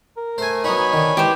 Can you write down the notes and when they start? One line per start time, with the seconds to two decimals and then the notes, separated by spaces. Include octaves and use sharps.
0.17 A#4
0.38 A3 C5 G#5
0.64 F#3 B3 D#4 C#5 G#5 B5
0.93 D3 D#3
1.17 E3 G#3 G4 C5